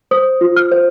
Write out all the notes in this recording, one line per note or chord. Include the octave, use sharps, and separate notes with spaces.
C5 D#6
F4
F6
C5